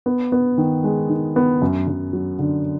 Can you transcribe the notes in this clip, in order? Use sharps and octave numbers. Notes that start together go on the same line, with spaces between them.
B3
B3
D#3
G#3
D#3
B3
F#2
F#2
F#3
D3